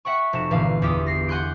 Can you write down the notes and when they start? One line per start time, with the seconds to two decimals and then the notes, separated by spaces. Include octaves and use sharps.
0.05 E5 F#5 G5 C#6
0.33 F1 F#4 E7
0.51 G1 A#2 E3 F5
0.82 E2 G4 D#6
1.06 A#6 C7
1.28 F#5 G#5 C6 F#6 G6 D7